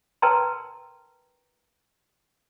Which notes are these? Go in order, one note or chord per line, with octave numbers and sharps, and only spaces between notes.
A#4 B4 G5 A5 A#5 C6